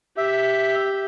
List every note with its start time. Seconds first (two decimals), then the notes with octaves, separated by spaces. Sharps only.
0.17 G4 E5